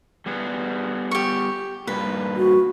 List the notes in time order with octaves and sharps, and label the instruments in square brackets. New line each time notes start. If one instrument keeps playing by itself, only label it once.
[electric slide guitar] G3 B3 G#4
[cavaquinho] G4 C#6
[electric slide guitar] G2 A#2 [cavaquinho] B4
[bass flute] F#4